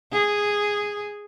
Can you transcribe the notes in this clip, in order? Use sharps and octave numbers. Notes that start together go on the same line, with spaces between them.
G#4